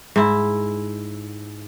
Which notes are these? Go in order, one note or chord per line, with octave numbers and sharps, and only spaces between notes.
G#2 E4